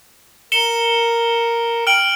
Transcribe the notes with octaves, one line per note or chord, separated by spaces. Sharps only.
A#4 C#7 E7 G7
G5 F6 D7 F#7